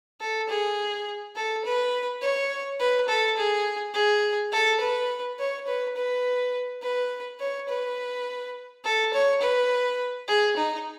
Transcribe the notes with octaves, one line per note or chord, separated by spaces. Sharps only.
A4
G#4
A4
B4
C#5
B4
A4
G#4
G#4
A4
B4
C#5
B4
B4
B4
C#5
B4
A4
C#5
B4
G#4
D#4